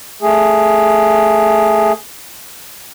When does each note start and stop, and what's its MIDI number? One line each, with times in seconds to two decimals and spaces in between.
0.22 1.93 57
0.22 1.93 68